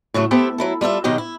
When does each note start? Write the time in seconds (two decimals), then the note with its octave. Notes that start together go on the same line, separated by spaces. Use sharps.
0.14 A2 C#3 F#3 A3
0.31 B3 E4 G4 A4 C5
0.58 F#3 E4 A4
0.81 G3 F4 A4 E5
1.04 B2 D#3 F#3 G4 D#5
1.18 E4